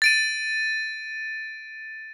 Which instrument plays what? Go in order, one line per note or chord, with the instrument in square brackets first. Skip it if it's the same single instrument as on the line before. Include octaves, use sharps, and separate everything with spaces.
[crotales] A6 D7 D#7